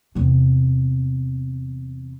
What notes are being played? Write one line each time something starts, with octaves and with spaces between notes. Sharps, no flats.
E2 C3